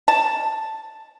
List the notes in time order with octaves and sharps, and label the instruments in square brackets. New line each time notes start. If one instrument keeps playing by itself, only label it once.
[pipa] A5